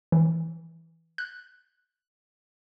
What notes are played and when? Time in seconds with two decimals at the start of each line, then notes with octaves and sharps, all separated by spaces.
0.12 E3
1.18 F#6